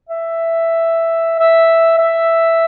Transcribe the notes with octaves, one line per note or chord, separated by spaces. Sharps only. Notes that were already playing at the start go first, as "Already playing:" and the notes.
E5
E5
E5